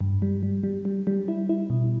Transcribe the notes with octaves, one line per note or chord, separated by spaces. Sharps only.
G2
G3
G3
G3
G3
G3
E4
E4
B2